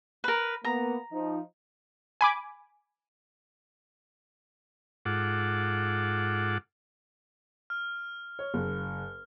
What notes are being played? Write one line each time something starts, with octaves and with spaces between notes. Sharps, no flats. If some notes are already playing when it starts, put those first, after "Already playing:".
A#4 B4
A#3 B3 A#5
F3 D#4
G#5 B5 D6
G#2 F4 A4 F#5 D6
F6
C#5
F#1